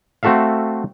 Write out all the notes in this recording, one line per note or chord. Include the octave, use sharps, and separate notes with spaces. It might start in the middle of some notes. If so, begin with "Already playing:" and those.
A3 C4 F#4 A4 E5 F5